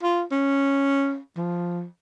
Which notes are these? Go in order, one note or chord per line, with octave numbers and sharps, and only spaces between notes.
F4
C#4
F3